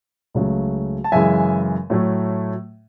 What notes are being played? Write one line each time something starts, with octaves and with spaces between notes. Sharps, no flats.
C#2 C#3 F#3 A3
A5
F#2 C#3 E3 G#3 E5 G#5
A2 F#3 A3